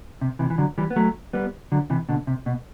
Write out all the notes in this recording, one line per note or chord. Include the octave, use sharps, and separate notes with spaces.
C3
C3 E3
E3
D3 F#3
E3 G3
B3
F#3 A3
G3 B3
D3 F#3
C3 E3
B2 D3
C3
B2